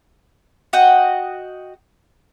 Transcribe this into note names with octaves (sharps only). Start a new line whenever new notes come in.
F#4 D#5 F#5 G5